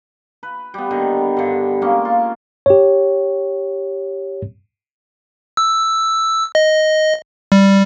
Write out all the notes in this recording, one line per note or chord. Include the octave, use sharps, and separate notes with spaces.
B4
G3 B3
D3 D#3 B3
G2 D3
G#3 A#3 C#4
F4
G4 C#5
E6
D#5
G3